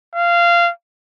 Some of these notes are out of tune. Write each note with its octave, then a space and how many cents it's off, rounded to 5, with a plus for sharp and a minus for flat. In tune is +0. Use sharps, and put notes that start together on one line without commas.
F5 -15